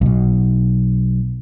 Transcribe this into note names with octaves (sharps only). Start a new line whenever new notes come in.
B1 B2